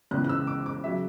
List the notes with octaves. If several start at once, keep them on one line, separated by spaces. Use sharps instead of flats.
C#2 C#3 E3 F#6
F#6
E6
D6
D6
C#3 F#3 E5